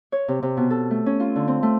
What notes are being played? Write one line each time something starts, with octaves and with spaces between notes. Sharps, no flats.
C#5
C3
C3
B2
A4
A3
C#4
F4
D3
C4
A3